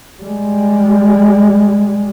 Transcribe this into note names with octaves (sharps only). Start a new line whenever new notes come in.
G3 G#3